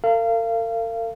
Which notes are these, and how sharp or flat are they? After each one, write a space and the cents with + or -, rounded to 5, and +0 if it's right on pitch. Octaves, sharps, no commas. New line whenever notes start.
A#4 -45 F5 -30